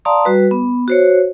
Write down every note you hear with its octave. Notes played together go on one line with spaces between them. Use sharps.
D5 F5 A5 A#5 C6 D#6
G3 F#4 B4
B3
F#4 C5 C#5